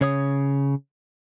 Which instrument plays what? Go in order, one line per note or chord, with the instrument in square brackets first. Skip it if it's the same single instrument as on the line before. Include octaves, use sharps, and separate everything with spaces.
[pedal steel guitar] C#3 C#5 D#6